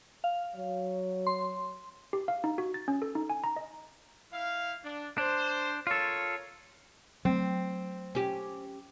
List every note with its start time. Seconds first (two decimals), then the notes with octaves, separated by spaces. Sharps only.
0.24 F5
0.55 F#3 C#5
1.27 C6
2.13 G4
2.28 F5
2.44 D#4
2.58 F#4
2.74 A6
2.88 C#4
3.02 A4
3.15 D#4
3.30 G#5
3.44 A#5
3.56 D#5
4.33 E4 F5
4.84 D4
5.18 D4 C5
5.87 F4 A4 A#4 C#5
7.25 F#3 A3 C4
8.15 C#4 G4